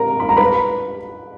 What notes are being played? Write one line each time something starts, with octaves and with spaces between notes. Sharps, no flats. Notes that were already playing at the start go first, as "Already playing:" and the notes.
Already playing: A#4 A#5
B5
A#5
B4 B5